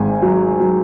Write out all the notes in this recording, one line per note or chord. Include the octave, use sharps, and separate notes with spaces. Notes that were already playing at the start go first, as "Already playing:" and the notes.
Already playing: G#1 G#2 G#5
F#3
F#3